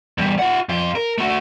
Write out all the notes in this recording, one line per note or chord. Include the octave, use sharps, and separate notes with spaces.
E2 G3
F4 F#5
F2 F4
A#4
A3 F#4